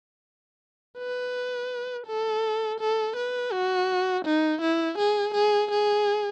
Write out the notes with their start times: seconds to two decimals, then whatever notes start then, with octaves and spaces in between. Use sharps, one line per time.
0.98 B4
2.07 A4
2.80 A4
3.16 B4
3.52 F#4
4.25 D#4
4.62 E4
4.98 G#4
5.34 G#4
5.71 G#4